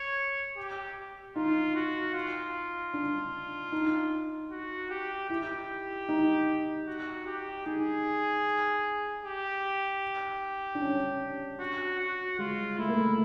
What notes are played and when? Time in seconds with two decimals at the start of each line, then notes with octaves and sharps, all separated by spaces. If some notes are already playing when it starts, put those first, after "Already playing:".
Already playing: C#5
0.57 G4
1.36 D#4 F4
1.75 F#4
2.14 F4
2.94 D4
3.72 D#4
4.51 F#4
4.90 G4
5.30 E4 G4
6.09 D#4
6.87 F#4
7.26 G4
7.66 D#4 G#4
9.24 G4
10.75 D4
10.81 C#4
11.60 F#4
11.99 F#4
12.39 G#3 F4
12.78 A3 E4
12.88 A#3
12.98 A3